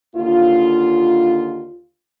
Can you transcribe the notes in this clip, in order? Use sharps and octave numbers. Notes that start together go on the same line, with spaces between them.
D#2 D3 A#3 F4